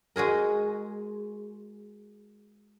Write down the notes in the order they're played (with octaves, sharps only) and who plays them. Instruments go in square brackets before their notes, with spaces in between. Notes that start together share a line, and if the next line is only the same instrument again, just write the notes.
[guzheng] G#3 F#4 G#4 A#4